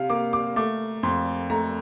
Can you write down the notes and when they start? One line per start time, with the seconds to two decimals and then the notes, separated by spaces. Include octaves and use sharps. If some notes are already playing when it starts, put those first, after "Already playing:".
Already playing: C3 F5
0.10 A#3 D6
0.33 D6
0.56 A3 D6
1.03 F2 C6
1.50 A3 A#5